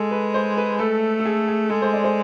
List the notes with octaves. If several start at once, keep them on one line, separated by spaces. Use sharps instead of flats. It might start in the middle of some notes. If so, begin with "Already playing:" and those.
Already playing: G#3 A4
B4
C5
B4
A3 A4
A4
G#4
G#4
G#3 A4
C5
D5
C5